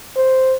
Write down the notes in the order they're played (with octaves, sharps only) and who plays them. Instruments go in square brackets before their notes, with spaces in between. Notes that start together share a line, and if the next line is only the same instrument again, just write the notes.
[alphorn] C5